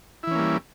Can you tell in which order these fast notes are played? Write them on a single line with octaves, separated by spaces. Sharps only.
E4 E3 C#4 A#3 G3